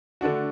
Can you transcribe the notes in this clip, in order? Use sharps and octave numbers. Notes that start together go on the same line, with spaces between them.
D3 A3 D4 F#4